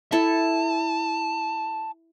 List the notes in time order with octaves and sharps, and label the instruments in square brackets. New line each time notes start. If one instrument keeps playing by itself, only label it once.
[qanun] E4 A4 [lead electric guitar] A5